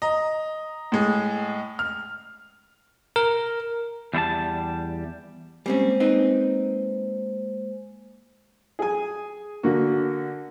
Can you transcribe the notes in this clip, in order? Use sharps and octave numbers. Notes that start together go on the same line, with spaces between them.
D#5 A#5
A2 G#3
F6
A#4
E2 G3 E4 G4 A5
G3 G#3 A#3 C4 C#4 C5
C4 D#4 B4
G#4 G#5
D3 A#3 F#4